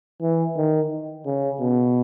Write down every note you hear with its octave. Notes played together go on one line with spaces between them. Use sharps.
E3
D#3
C#3
B2